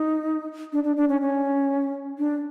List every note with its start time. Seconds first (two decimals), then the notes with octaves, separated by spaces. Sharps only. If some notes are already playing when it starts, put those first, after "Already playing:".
Already playing: D#4
0.73 D4
0.84 D4
0.97 D4
1.09 C#4
1.21 C#4
2.18 D4